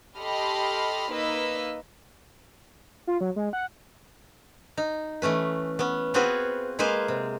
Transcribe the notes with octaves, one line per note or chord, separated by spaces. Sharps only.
G4 A4 D#5 B5 C6 F6
A#3 D#4 B4 D#5 E6
F4
F#3
G#3
F#5
D#4
E3 A3 C#4 B4
B3 C#4
B3 C4 F4 F#4 G#4 B4
G#3 A#3 G#4 B4 C5 F5
C3